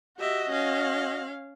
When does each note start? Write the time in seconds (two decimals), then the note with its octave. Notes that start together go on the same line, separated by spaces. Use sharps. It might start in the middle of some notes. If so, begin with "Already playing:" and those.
0.19 F#4 G4 D#5 E5
0.50 C#4 F5